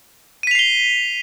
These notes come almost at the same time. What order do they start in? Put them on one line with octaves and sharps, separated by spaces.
D#7 B6 F7 C7 G7